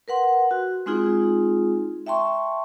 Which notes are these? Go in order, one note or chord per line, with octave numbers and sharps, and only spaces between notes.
A#4 B4 F#5 C6
F#4
G#3 C4 D#4 F4 G#4
E5 G5 A5 C6 C#6